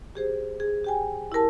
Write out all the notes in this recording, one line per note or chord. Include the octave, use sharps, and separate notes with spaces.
G4 G#4 C5
G#4
G4 G5 G#5
E4 G4 A#4 A5